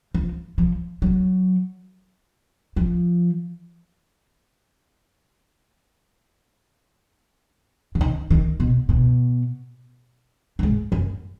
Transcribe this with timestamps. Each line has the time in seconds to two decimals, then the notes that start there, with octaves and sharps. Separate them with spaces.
0.14 F3
0.58 F3
1.02 F#3
2.76 F3
7.95 D3
8.01 D#3
8.31 D#3
8.60 B2
8.89 B2
10.59 F#2
10.63 G#2
10.92 F#2